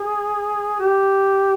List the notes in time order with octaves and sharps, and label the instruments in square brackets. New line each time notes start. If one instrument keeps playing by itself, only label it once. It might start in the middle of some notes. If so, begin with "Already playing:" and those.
Already playing: [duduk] G#4
G4